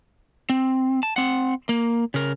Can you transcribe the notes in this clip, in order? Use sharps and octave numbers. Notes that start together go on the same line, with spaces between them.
C4
A5
C4 F#5
A#3
C#3 A#4